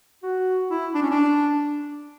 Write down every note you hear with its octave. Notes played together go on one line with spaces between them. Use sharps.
F#4
E4
D4
C#4
D4